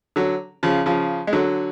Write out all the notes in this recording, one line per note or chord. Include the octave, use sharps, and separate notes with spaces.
D3 F#3
C#3 F3
C#3 F3
G#3
D3 F#3